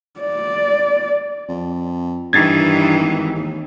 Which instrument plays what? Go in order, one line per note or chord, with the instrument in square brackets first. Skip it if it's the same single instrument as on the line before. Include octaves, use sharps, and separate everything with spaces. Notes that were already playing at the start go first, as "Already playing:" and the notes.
[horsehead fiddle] D5
[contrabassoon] F2
[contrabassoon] G2 [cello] D#3 E3 [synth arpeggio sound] G#6 A6
[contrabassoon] G#1
D#2